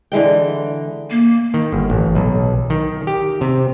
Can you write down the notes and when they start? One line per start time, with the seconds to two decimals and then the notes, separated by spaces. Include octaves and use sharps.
0.12 D3 E3 G#3 G5
1.11 A#3
1.54 D#3
1.72 G1
1.90 A1
2.15 B1
2.70 D#3
3.07 G4
3.41 C3